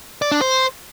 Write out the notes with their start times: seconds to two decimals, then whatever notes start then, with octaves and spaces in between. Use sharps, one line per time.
0.22 D5
0.32 D4
0.41 C5